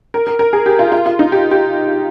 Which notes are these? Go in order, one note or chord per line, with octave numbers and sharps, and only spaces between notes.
A#4
A#4
A#4
G#4
G4
F4
F4
F4
D#4
G4
G4